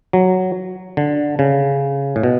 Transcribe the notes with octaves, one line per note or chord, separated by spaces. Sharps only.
F#3
D3
C#3
A2
B2